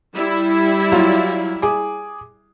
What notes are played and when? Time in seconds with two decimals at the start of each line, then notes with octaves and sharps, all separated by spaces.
0.15 G3 E4
0.92 F#3 F4 F5
1.62 G#4 D6